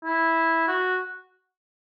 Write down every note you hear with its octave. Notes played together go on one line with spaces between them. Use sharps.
E4
F#4